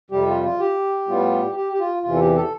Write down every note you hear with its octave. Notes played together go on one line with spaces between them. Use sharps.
F2 C3 G3 G4
F4
F4
G4
A2 G3 B3 F4
G4
G4
F4
E2 C3 E3 F4
A4
G4
A4